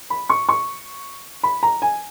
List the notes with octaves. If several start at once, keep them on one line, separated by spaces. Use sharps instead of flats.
B5
C#6
C#6
B5
A#5
G#5